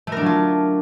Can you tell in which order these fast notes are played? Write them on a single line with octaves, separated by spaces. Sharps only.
A3 A#4 D4 F#3 F4